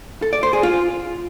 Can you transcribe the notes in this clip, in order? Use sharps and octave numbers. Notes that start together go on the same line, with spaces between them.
A4
D5
C5
G#4
F4